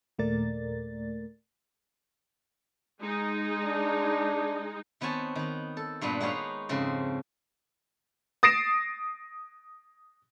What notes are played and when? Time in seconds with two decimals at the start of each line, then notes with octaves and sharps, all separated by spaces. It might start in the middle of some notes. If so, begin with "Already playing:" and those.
0.18 D#2 A#2 A3 A#4 D5 A6
3.00 G#3 D#4
3.63 D4
5.01 D#3 B3 C4 C#5 G#5 A5
5.35 D#3 B3
5.77 A4
6.01 G2 A#2 B3 D4
6.20 G#3 B3 D#4 C#5 F5
6.69 F2 G#2 C#3 C4
8.43 D#6 A6 A#6 C7 D7 E7